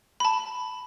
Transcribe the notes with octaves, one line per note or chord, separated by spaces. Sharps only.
A5 B5